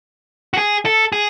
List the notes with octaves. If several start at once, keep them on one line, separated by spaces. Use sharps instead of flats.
F#4
G#4
A4
G#4